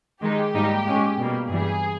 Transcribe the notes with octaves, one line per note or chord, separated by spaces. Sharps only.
D#3 G#3 D#4 G4
G#2 G3 A#3 D#4
A#2 G#3 C#4
B2 G3 A#3
G2 E3 G3 G#4